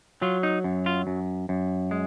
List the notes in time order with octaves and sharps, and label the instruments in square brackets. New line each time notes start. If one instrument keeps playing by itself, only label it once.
[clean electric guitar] F#3 F4
D#4
F#2
F4
F#2
F#2
G#3